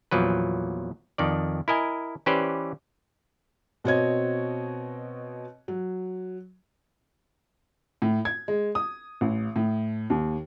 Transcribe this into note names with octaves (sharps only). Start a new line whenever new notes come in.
E2 A#2 F3 F#3 B4
F2 D#3 D5
E4 A#4 D#5 G#5
E3 C#4 G4 B4 C5 D5
B2 C4 F#4 C#5 D#5 G#6
F#3
A2
G#6
G#3
D#6
A1
A2
D#2